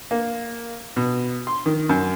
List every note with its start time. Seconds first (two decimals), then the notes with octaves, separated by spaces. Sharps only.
0.11 A#3
0.96 B2
1.47 C6
1.66 D#3
1.89 F#2